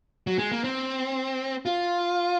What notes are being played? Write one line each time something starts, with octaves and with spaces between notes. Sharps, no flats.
F#3
G#3
A#3
C4
F4